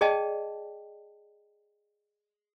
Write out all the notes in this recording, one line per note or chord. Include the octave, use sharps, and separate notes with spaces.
G#4 D5 D#5 G5 A5